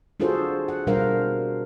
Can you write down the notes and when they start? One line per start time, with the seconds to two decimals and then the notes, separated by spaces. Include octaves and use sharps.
0.20 D4 F4 F#4 G#4 A4 C5
0.68 F#5
0.87 B2 G3 D4 A#4 C5 F5